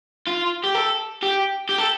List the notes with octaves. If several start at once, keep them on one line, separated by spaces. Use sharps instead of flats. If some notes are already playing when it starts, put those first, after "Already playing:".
F4
G4
A4
G4
G4
A4